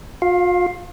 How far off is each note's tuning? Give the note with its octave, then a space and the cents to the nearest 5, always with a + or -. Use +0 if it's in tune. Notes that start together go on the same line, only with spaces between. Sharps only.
F4 +40 F5 +5